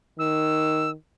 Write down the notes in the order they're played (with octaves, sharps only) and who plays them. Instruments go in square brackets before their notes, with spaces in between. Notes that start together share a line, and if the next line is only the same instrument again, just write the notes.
[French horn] D#3 [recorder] E6